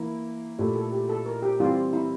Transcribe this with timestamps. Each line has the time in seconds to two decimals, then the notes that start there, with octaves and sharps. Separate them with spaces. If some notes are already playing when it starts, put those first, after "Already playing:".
Already playing: E3 A#3 E4
0.59 A#2 A3 E4 G4
0.76 A4
0.92 G4
1.09 A4
1.26 A#4
1.42 G4
1.60 E3 G3 C4 F4 G4
1.93 E4